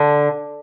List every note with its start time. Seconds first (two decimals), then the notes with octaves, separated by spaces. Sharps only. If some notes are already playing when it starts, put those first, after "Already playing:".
Already playing: D3